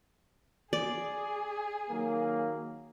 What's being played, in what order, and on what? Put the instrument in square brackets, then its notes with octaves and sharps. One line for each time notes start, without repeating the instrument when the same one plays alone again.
[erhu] G#4 [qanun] D5
[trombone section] D#3 F#3 A#3